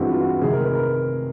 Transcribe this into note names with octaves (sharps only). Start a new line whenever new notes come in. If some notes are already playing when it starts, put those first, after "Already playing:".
Already playing: G2 E3 G#3 C4 E4 F#4
F4
F#4
C3 D#3 G#3 G#4
A#4
B4
A#4